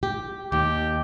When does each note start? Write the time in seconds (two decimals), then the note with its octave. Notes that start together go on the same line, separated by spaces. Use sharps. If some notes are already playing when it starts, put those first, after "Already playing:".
0.03 G4
0.52 D#2 G4